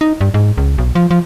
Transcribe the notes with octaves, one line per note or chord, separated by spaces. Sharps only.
D#4
G2
G#2
C#2
B1
F3
F3